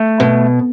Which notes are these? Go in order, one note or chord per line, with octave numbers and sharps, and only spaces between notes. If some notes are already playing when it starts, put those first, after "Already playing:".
Already playing: A3
B2